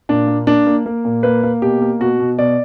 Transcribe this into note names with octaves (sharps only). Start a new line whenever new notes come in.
A#2 D4
A#3
A#3 D4
A#3
A#3
A#2
A#3 B4
A#3
B2 G4
A#3
B2 F#4
B2
B2 D5